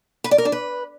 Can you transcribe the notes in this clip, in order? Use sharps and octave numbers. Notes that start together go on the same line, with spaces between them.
B4
D5
A#4
D4
B4